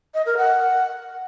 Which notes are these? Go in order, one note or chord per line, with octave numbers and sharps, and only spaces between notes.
D#5
A#4
F#5